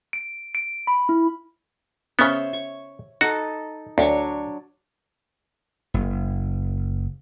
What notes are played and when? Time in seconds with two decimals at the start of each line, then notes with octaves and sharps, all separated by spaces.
0.13 D7
0.55 D7
0.87 B5
1.09 E4
2.19 C#3 B3 C5 C#5 E5
2.53 C#6
3.21 D#4 F#4 A4
3.98 D2 F#3 D4 C#5
5.94 F#1